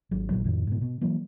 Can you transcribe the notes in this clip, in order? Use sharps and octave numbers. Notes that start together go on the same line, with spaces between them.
G#1 F#3
G#1 D#2 A#2 F#3
F2 A2 D#3
G#2 B2
B2
E3 F#3 A#3